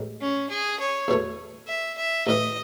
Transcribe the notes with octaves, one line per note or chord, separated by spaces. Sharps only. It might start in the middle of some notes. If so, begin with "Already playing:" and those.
Already playing: A1 A2 G#3
C#4
G#4
C#5
E2 B2 A3
E5
E5
A1 A2 E3 D#5